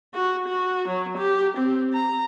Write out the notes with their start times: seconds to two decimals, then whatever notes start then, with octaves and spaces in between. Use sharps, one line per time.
0.14 F#4
0.48 F#4
0.88 F#3
1.17 G4
1.57 C4
1.93 A#5